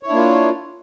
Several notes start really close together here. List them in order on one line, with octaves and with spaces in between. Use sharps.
C#5 E4 D4 A#3 F4